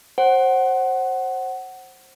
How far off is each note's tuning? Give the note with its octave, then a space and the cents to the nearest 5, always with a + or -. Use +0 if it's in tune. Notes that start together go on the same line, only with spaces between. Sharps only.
C5 +25 F#5 +15